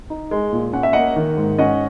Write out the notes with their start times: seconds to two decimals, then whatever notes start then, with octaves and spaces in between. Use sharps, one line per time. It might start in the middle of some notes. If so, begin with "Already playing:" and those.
0.10 D#4
0.31 G#3
0.53 A#2
0.73 C#4 F#5
0.83 E5
0.93 A#3 D#5 F#5
1.16 D#3
1.37 G#2
1.59 C#4 D#5 F#5